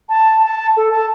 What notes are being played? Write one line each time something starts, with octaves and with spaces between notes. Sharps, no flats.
A5
A5
A4
A5